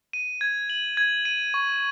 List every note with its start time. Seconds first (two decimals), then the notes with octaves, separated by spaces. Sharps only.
0.13 D#7
0.41 G#6
0.70 F#7
0.97 G#6
1.25 D#7
1.54 C#6